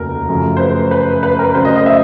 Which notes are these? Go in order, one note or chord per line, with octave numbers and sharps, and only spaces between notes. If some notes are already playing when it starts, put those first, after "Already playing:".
Already playing: F1 D#2 C#3 F#3 A3 A#4
F#2 C#3 F3 A3
C5
B4
B4
B4
A#4
D2 C#3 F#3 C5
D#5
D#5
E5